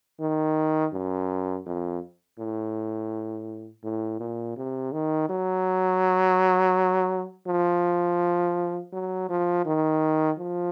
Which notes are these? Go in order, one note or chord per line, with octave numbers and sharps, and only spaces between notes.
D#3
F#2
F2
A2
A2
A#2
C3
D#3
F#3
F3
F#3
F3
D#3
F3